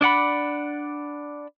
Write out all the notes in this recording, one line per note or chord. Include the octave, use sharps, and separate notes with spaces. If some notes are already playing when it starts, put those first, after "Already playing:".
D4 D5 F#5 B5